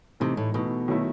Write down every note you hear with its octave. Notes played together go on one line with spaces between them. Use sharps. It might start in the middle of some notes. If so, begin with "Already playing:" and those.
C3 E3 A3 D#4
A2
B2 E3 A3 D#4
D#3 F#3 A3 E4